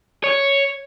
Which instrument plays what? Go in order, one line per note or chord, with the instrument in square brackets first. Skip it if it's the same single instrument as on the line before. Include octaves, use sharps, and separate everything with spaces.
[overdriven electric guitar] C#5